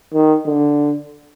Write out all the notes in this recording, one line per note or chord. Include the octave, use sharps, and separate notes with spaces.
D#3
D3